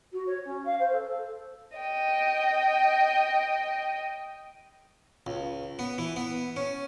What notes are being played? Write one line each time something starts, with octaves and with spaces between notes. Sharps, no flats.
F#4
C#5
C#4
F5
C5
A4
A4
D#5 G5
C#2
B3
E3
B3
C#4